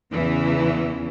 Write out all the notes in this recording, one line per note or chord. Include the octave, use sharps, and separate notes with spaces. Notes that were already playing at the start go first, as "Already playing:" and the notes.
E2 C#3 E3